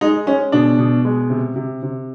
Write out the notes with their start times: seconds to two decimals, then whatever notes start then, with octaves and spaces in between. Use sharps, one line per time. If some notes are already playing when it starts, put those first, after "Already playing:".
0.01 G#3 D#4
0.27 G#3 C#4
0.52 B2 D4
0.79 B2
1.05 G#3
1.30 C3
1.56 C3
1.83 C3